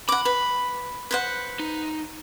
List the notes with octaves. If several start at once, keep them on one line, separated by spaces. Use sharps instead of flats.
F#5 B5 D6
B4
B4 C5 F#5
D#4